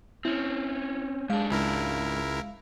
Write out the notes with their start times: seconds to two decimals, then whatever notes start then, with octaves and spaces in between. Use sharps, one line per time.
0.25 C4 C#4 E4
1.30 G#2 G#3 D4 F5
1.51 C#2 E4 A#4